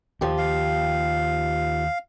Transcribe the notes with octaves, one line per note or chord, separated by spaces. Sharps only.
D#2 F3 G4
F5